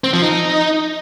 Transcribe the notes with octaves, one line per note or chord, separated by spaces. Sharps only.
C4
F3
D#4